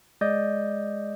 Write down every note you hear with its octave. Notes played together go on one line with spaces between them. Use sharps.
G#3 D5 D#5 G6